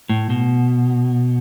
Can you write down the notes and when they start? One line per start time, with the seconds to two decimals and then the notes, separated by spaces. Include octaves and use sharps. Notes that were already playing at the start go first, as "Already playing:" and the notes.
0.10 A2
0.30 B2